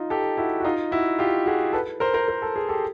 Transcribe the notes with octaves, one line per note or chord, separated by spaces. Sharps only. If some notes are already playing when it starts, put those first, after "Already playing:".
Already playing: D#4 F4
G4 A4
E4 F#4
F#4
D#4 F4
E4 F#4
F4 G4
F#4 G#4
A4 B4
A#4 C5
A#4 C5
A#4
A4
G#4
G4 A4